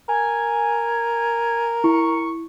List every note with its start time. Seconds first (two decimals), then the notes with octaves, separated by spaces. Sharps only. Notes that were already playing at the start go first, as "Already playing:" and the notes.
0.09 A#4 G#5
1.84 E4 C#6